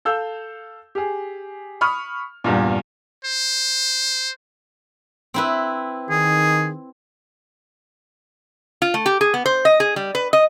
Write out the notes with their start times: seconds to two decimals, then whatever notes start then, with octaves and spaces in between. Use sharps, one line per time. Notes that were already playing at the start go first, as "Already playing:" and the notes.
0.05 A4 F5 E6 G6
0.95 G4 G#4
1.81 B5 C#6 D#6 F6
2.44 E2 G2 A#2
3.25 C5
5.34 C4 E4 B4
6.10 D#3 G#4
8.82 F4
8.94 A3
9.06 G4
9.21 G#4
9.34 B3
9.46 C5
9.65 D#5
9.80 G#4
9.96 G3
10.15 B4
10.33 D#5